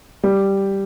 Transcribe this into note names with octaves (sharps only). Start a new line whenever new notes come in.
G3